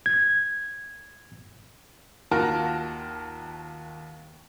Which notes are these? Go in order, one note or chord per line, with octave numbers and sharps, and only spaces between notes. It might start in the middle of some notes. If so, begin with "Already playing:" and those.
G#6
D#2 F4 F#4 A#4 A5